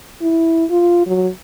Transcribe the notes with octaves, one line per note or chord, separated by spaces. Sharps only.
E4
F4
F#3